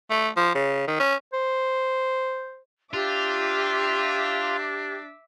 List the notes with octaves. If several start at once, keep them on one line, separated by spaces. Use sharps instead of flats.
A3
F3
C#3
D#3
C#4
C5
D4 F4 G4 E5 D6